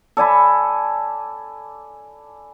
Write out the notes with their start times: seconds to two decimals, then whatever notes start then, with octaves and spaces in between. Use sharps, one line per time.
0.17 A4 D5 G#5 B5